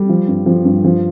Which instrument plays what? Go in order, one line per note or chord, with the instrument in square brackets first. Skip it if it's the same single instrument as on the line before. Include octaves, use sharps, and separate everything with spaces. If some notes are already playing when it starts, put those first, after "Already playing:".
Already playing: [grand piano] G3
F3
G2
F3
G2
F3